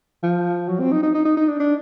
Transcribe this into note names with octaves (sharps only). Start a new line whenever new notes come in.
F3
F#3
C4
D#4
D#4
D#4
D#4
D#4
D4
D4